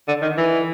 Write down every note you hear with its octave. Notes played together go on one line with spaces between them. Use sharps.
D3
D#3
E3